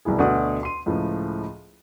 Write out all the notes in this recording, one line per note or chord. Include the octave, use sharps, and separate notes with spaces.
C2 B2 E4 G#4
D2 B2 F#4 D5 F#5 D#6
C6 D#7
C#2 A2 F3